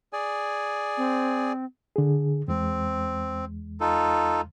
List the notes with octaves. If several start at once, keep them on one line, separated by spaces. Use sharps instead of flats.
G#4 D5 G#5
C4
D3 G#4
E2 G#3 C4
D#4 F4 A4